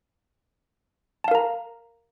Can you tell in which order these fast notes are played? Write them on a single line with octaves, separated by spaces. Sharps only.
A5 F5 A#4 A#5